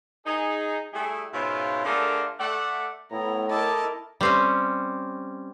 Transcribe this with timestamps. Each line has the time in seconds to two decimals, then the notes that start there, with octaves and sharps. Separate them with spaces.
0.26 D#4 G#4
0.92 G3 A3 E4 G#4
1.33 G#2 B2 C#4 E4 F4
1.84 D3 A3 F4 G#4 A#4 D5
2.40 A3 D5 F#5
3.12 A2 B3 E4 A#5
3.50 E4 A4 A#4 D#5 A5 D6
4.21 G3 C4 C#4